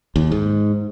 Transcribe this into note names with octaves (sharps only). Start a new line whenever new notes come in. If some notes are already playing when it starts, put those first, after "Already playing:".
D#2
G#2